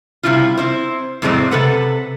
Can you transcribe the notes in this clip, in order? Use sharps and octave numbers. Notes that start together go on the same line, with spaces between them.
C3 D#3 G3 E4 F4
C4 E4 C5
F2 A2 F#3 G#3 C4 D5
C3 A4 B4 F#5